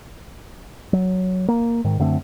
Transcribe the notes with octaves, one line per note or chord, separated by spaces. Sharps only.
F#3
A#3
G#2 D#3
F#2 D3 A3 C4